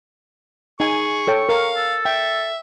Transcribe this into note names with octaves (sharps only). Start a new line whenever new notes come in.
D#4 G#4 G#5 C#6
A4 C#5 G5
A#4 F5
A4
E5 G5